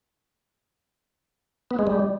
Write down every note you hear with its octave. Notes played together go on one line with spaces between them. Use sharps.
B3
G#3
G3